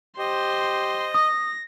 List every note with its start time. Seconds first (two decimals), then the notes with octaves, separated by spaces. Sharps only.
0.19 G4 C5 D#5 C6
1.14 D#6 A#6